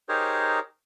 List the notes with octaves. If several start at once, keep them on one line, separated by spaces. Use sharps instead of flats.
D#4 G4 G#4 A#4 C5 C#5